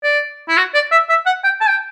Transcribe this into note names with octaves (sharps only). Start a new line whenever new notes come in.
D5
E4
F#4
D5
E5
E5
F#5
G5
A5
G5